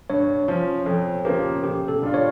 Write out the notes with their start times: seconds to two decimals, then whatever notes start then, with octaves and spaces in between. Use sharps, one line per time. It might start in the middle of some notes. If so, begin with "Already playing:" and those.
0.10 G2 C#5
0.48 F3 C#4
0.86 F2 A4
1.25 C#3 F3 A#3 G4
1.63 C#3 G4
1.88 A4
2.02 G3 D4 F4
2.14 C#5